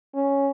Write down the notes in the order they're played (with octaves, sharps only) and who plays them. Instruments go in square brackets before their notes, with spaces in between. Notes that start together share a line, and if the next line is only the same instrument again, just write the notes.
[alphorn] C#4